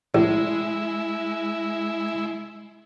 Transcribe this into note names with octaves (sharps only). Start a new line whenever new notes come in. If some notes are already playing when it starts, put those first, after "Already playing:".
A1 G#3 E4